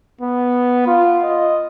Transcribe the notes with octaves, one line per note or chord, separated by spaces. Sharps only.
B3
F4
D#5